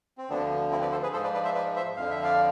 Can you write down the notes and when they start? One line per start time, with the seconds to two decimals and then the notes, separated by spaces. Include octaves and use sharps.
0.18 C4
0.29 D2 D3 F3 B3 D4
0.71 C4 E4
0.81 B4 D5
0.92 A4 C5
1.03 G#4 B4
1.13 G#2 F3 A4 C5
1.24 B4 D5
1.34 B4 D5
1.44 C5 E5
1.55 B4 D5
1.76 C5 E5
1.97 F2 D3 F3 F5
2.10 E5
2.23 D5 F5